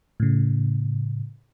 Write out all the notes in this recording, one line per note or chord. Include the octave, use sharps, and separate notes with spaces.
A2 C#3